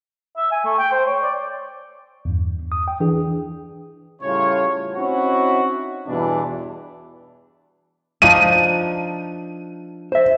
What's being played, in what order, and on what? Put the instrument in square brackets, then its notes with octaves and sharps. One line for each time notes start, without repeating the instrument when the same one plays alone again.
[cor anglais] E5
G#5
A3
G5
C5
C#5
D5
[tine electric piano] E2 G2
D#6
G5
E3 D4 G#4
[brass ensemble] A2 C#3 G3 F4 C#5
C4 C#4 D#4 E4 F#4
E2 G2 B2 E3 D4
[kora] F3 D4 D#4 [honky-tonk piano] D#7
[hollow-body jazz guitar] C5 E5